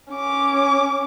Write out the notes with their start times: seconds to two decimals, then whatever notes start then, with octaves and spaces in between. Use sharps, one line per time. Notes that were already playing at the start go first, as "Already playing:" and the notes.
0.12 C#4 D6